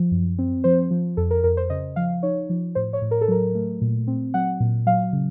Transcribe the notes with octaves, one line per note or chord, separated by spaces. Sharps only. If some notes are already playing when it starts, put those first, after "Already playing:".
Already playing: F3
F#2
C4
F3 C5
F3
F2 A4
A#4
F2 A#4
C5
C#3 D#5
F3 F5
D#4 C#5
F3
A2 C5
C#5
A2
A#4
A4
F#3 A#4
A3
A#2
C4
F#3 F#5
A#2
F#3 F5
C#3